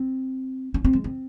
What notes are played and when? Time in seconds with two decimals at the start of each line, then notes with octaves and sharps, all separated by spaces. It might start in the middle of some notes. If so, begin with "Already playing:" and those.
Already playing: C4
0.74 C#4
0.84 C4
0.93 G#3
1.04 C4